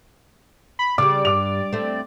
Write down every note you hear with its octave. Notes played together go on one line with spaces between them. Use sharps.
B5
C#3 G3 D5 D6
G2 D6 F7
A3 C4